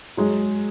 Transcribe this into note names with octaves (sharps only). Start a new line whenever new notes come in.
F#3 G#3